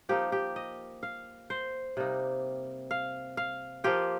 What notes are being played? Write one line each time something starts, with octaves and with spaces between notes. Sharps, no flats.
F3 A#3 D#4 G4
G4
D#5
F5
C5
C3 G3 A#3 D#4
F5
F5
F3 A#3 F4 G4